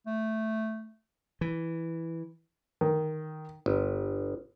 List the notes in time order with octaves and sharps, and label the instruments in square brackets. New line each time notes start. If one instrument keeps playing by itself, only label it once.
[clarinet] A3
[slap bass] E3
[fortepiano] D#3
[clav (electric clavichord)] G1